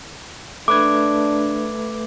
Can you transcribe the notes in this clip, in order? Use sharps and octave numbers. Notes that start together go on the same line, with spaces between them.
A3 D4 B4 D6 G#6